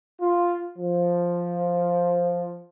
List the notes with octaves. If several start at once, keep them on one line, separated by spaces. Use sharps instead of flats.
F4
F3